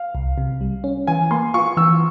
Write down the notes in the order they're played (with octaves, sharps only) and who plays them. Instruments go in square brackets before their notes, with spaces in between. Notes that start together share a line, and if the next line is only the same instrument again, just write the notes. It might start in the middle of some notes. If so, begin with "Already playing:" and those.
Already playing: [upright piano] F5
[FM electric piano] C2
C3
G3
C#4
[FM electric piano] E3 [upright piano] G#5
[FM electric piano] A#3 [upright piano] C6
[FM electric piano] F4 [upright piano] C#6
[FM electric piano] E3 [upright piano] E6